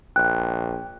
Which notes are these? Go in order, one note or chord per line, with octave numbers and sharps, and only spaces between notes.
A#1 G5 F#6